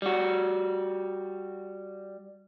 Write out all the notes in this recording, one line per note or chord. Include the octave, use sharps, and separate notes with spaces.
G3 F#4